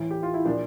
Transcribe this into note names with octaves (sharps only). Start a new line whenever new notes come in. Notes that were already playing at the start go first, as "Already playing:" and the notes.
Already playing: A2 E3
G4
F4
E4
A#2 F3 D4